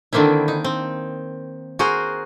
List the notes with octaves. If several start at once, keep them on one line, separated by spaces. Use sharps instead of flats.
D3 D#3 A#3 C4 E4
D#4
C4
F#4 G#4 A#4 C5